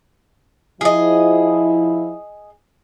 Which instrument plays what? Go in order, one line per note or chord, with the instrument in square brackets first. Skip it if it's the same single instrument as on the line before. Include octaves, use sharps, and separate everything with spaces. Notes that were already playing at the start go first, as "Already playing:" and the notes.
[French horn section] F3 E4 [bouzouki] G#4 D#5